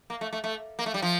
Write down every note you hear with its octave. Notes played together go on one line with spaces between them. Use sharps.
A#3
A3
A3
A3
A#3
A3
G3
F3